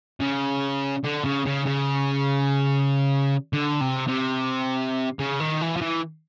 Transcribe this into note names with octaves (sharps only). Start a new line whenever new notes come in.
C#3
D3
C#3
C#3
C#3
D3
C3
C3
C#3
D#3
E3
F3
E3